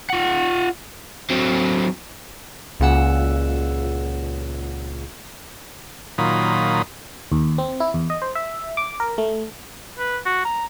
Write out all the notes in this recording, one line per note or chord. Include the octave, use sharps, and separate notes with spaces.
F4 F#5
F#3 C4
C#2 A#2 C#3 F#5 E6
A#2 D#3 F#3 F4 B5 D#6
D#2
C4
E4
E2
D#5
C5
E5
D6
A#4
A3
B4
F#4
A#5